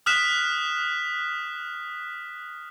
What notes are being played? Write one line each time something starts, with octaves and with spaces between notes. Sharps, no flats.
D#6 F6 F#6 B6 E7